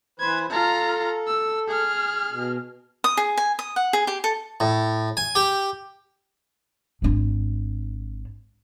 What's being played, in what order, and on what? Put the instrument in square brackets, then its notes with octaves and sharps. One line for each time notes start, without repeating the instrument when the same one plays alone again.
[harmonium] E3 B4 C5 [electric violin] G#6
[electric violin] F4 A#5 [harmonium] A4
[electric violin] E6
G#4 F6
[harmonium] B2
[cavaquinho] D#6
G#4
G#5
D#6
F#5
G#4
G4
A4
[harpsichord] A2
G#5
G4
[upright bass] G#1 D4